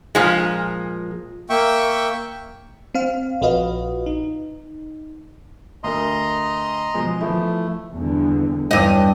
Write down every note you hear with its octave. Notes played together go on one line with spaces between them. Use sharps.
A#2 F3 G#3
A#3 E5 G5 C#6
C4 F5
A#1 F4 F#4 B4 D#5 F5
D#4
D2 A#4 D#5 A#5 C6
B2 F3 G#3
E3 F3 A3 E4
E2 G2 D3
E2 G2 D#5